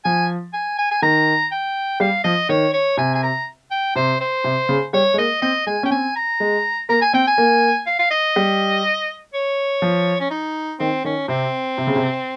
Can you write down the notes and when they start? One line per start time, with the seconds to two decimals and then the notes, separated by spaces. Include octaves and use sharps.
0.05 F3 G#5
0.53 G#5
0.79 G#5
0.91 G#5
1.02 D#3 A#5
1.52 G5
2.00 G3 F5
2.24 F3 D#5
2.49 D#3 C#5
2.73 C#5
2.97 C3 G#5
3.15 G#5
3.23 A#5
3.71 G5
3.96 C3 C5
4.21 C5
4.44 C3
4.69 C#3
4.93 G3 C#5
5.14 G#3
5.18 A#3 D#5
5.42 C4 D#5
5.67 G#3 G#5
5.83 C#4 G5
5.91 C4 G#5
6.16 A#5
6.40 G#3
6.89 A#3 A#5
7.01 G#5
7.13 C4 G5
7.27 G#5
7.38 A#3
7.87 F5
7.99 F5
8.11 D#5
8.36 G3
9.34 C#5
9.82 F3
10.20 C#4
10.31 D#4
10.79 D#3 C4
11.04 D#3 C#4
11.28 C3 C4
11.78 C3
11.87 C#3
11.96 C3